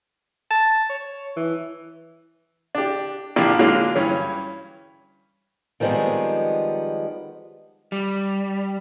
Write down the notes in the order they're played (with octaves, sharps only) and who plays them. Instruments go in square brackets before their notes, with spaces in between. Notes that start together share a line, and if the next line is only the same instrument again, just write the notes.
[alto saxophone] A5
C#5
E3
[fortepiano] D4 G4
A#1 A#3 D4 E4 F4 G4
D3 F#3 G#3 A#3 C#4 F4
G2 E3 C#4
[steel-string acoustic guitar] D#3 F3 G3 G#3 B3 C4
[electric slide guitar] G3